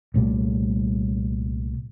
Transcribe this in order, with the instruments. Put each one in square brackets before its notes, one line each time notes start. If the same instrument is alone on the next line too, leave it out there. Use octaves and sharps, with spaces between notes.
[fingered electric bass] C2 A#2 G3 A3